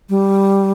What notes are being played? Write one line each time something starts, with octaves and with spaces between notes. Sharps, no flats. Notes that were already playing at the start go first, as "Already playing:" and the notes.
G3